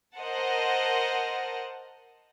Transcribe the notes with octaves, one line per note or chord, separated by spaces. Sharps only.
A#4 C5 D#5 F#5 A5